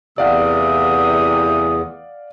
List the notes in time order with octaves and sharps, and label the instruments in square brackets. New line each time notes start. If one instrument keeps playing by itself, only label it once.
[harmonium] E2 [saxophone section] C3 E3 A3 [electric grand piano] D5 F5 F#5 [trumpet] D#6